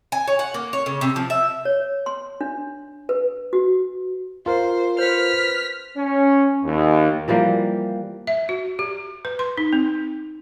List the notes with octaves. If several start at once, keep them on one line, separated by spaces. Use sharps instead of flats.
G#5
C#5
F#5
A#3
C#5
C#3
C3
F3
E5
C#5
C6
D4
B4
F#4
F4 A#4 C5
B4 C5 F6 B6
C#4
D#2
E3 F3 G3 A#3
E5
F#4
G4
B4
C6
D#4
C4